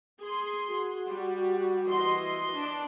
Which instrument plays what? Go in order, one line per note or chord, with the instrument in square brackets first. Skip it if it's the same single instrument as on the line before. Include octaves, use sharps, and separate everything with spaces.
[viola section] G#4 C6
[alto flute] F#4
[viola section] G3
E3 D#5 C6
D4